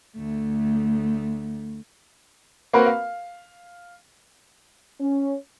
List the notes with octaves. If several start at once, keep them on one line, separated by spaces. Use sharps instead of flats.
D2 A3
A#3 C4 F#4 A#4 B4
F5
C#4